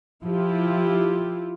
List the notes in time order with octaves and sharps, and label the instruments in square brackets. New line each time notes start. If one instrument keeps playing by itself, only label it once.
[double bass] F3 [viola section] E4 F4 G4